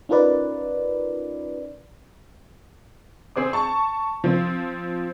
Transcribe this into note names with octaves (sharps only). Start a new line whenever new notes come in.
C#4 D#4 F4 A#4 B4 D5
C4 G#4 C5 D6
A5 C#6
F3 C4